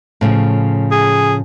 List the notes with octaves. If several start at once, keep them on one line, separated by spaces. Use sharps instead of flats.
A2 C#3 F3
G#4